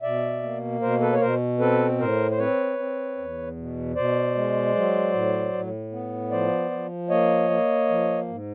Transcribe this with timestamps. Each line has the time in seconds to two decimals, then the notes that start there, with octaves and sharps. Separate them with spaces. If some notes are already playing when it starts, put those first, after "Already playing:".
0.02 B2 D5 E5
0.42 A#3
0.81 B2 A#4 C5
1.01 A4 B4
1.12 C#5
1.20 B2 A#4 C5
1.59 C4 A4 B4
1.99 A2 A#4 C5
2.31 C5
2.38 C4 B4 C#5
2.78 C4
3.17 E2
3.57 B2
3.95 B2 C5 D5
4.35 G#3
4.75 F#3
5.13 A2
5.53 A2
5.92 B3
6.31 F3 C5 D5
6.71 F3
7.10 A#3 C#5 D#5
7.50 A#3
7.89 F3
8.28 G#2